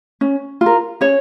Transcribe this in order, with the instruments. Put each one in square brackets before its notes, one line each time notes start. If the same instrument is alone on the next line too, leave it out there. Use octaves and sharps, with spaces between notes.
[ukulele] C#4
F4
A#4
C#4 C#5